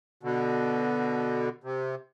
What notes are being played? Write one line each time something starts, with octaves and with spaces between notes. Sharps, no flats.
B2 D3
C3